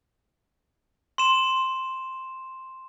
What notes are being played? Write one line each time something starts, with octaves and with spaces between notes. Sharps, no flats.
C6 E7